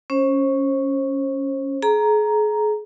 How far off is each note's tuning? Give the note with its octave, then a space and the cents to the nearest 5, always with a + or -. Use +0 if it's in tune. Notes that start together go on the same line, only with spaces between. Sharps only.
C#4 +0 C5 +35
G#4 +35 A#5 +0